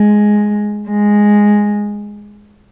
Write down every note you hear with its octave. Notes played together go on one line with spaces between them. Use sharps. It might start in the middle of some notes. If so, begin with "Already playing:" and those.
Already playing: G#3
G#3